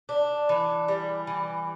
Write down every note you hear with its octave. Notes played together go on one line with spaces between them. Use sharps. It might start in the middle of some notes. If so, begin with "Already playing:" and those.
D4
E3
G3
E3